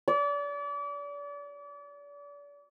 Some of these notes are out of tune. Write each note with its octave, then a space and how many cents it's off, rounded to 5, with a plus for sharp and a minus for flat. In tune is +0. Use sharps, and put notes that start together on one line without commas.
D5 -35